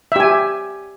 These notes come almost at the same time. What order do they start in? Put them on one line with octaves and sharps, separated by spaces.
E5 G4 G#5